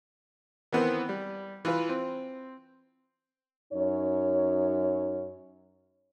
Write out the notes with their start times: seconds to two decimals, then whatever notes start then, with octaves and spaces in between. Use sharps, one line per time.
0.72 D#3 E3 B3 C4 B4
1.09 G3
1.65 E3 F4 B4
1.89 C4
3.72 F#2 D#4 C#5